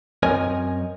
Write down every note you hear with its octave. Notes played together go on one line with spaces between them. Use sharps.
F#2 C4 A#4 C#5 D#5 G#5